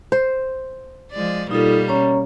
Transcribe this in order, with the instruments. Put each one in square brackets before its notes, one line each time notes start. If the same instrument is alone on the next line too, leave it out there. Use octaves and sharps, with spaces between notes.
[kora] C5
[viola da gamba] F3 G#3 D5
[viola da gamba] B2 G3 A#3 [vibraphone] D#4 F4 A4
[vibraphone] C#4 C#5 A#5